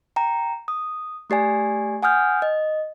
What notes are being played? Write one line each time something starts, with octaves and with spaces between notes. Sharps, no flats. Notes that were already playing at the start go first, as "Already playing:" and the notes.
G5 A#5
D#6
A3 G4 D5 G#5
F#5 G#5 D#6 F6 G6
D#5